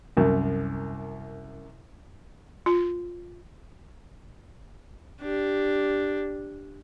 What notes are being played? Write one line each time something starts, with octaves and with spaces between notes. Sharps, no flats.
C2 F#2
F4
D4 G4